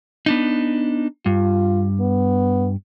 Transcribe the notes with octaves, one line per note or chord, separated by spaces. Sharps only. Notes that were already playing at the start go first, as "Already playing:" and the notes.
B3 D4 D#4
G2 F4
B3